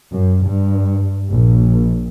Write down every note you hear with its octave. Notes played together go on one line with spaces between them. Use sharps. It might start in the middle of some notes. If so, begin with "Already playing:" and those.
F#2
G2
A#1